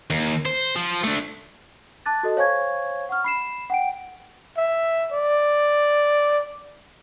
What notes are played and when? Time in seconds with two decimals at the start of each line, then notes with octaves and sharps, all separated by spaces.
0.10 D#2
0.45 C5
0.76 F3
1.04 A3 D4
2.06 A5 D6 F#6 A6
2.23 F#4 A4 D#5
2.36 C5 C#5 F5 G#5 C#6 G#6
3.09 F#5 C#6 F6
3.24 B5 C7 E7
3.70 F#5 G5 D7
4.57 E5
5.13 D5